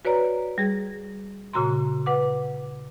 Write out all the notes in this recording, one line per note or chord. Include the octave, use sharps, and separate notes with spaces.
F#4 B4 C#5 D5 A#5
G3 G#4
A#2 C#3 F#4 A#5 C6
B4 F#5 D6